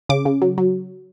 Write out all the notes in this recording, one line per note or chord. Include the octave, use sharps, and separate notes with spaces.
C#3 D6
C#3
F#3
F#3